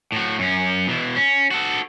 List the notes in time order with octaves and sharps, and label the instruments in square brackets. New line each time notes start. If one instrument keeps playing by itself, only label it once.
[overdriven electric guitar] A2 F#4
F#2 C#4
B2 E3
C#4
F#4 A4